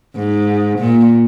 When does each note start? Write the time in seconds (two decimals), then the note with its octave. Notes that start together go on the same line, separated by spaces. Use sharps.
0.17 G#2
0.79 A#2